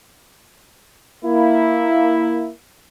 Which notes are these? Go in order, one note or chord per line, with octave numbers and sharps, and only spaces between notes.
A#3 E4